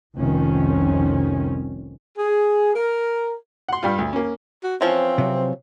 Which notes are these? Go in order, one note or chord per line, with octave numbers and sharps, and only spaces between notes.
F1 C2 F2 D#3 C4 C#4
G#4
A#4
F#5 C6
G2 G3 F4
D2
A#3 C#4
F#4
E3 F3 C4 C#4
C3 F#3